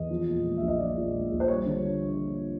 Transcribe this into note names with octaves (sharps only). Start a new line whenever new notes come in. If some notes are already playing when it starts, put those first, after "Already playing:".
Already playing: E2 D#5
F3
A#2
G#3
A#1 E5
D#5
F3 D5
A#2
G#3
A#1
C5
G3 C#5
D3